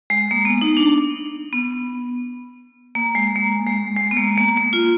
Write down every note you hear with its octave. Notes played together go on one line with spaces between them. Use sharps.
G#3
A#3
B3
D#4
D4
B3
A#3
G#3
A#3
G#3
G#3
B3
A#3
A#3
A#3
F4